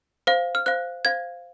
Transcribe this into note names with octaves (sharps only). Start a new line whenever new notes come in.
C5 F5
F6
C5 F5 F#6
C5 F5 G#6